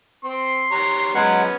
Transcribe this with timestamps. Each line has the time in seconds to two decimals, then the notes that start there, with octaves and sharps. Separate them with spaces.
0.25 C4 C6
0.72 G4 C#5 A#5
1.14 F#3 G#3 B3 C#4 F#5